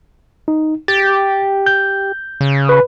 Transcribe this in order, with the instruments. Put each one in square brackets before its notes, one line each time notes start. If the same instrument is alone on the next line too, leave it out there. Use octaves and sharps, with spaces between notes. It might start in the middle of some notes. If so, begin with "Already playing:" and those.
[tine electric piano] D#4
[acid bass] G4 [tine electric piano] A6
[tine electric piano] G6
[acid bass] C#3
[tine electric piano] B4 B5